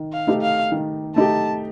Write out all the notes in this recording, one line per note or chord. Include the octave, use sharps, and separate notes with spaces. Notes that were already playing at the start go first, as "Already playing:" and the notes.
Already playing: D#3
F5
A3 D#4 G4
F5
D#3
A3 D#4 G4 A5